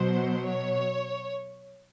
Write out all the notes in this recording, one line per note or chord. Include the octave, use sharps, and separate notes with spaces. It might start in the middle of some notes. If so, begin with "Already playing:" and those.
Already playing: B2 F#3 C5
C#5